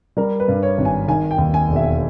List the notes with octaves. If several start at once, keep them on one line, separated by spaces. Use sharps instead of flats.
G3 A#4
B4
G2
C#5
G#1
G#5
D#3 G#5
G5
D#2
G#5
E1
E5